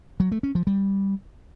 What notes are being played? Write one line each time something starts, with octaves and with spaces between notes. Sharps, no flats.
F#3
A3
C#4
F3
G3